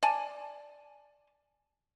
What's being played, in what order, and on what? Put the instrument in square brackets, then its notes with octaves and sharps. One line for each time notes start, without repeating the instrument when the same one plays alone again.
[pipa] D5 G#5 A5